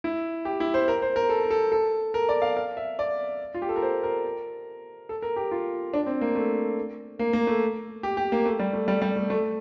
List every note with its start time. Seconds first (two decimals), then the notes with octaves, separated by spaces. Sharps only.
0.04 E4
0.45 G4
0.60 E4
0.74 C5
0.88 A#4
1.02 C5
1.16 A#4
1.29 A4
1.43 A#4
1.50 A4
1.72 A4
2.14 A#4
2.29 D5
2.42 F5
2.57 F5
2.77 E5
2.99 D5
3.54 F4
3.62 G4
3.69 A4
3.76 A#4
3.82 C5
4.03 A#4
5.09 A4
5.22 A#4
5.36 G4
5.51 F4
5.94 D4
6.06 C4
6.21 A#3
6.35 A3
7.19 A#3
7.33 A#3
7.47 A3
8.03 G4
8.17 G4
8.32 A#3
8.45 A3
8.59 G3
8.73 A3
8.88 G3
9.02 G3
9.16 A3
9.30 A3